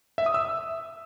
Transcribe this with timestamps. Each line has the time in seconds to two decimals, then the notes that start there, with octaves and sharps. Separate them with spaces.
0.18 E5
0.26 D#6
0.34 E6